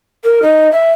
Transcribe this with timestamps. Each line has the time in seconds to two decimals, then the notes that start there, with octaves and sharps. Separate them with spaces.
0.24 A#4
0.42 D#4
0.72 E5